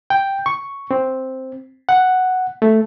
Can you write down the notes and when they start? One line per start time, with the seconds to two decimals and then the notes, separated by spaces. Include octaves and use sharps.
0.10 G5
0.46 C#6
0.91 C4
1.89 F#5
2.62 A3